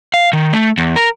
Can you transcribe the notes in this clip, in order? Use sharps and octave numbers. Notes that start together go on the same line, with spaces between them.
F5
D#3
A3
E2
A#4